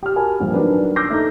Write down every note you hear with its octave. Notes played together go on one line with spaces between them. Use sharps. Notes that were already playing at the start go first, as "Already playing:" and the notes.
G4 F6
F#4 A#4 G#5 A5 B5
A#1 G2
D#3 F#3 D4 A#4 B4
D6 E6 F6 G6 A#6 C7
A3 D#4